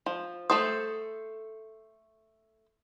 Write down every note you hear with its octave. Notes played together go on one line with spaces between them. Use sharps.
F3
A3 A4 C5 D#6